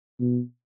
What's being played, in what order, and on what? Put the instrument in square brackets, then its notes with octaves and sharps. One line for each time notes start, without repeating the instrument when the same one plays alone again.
[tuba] B2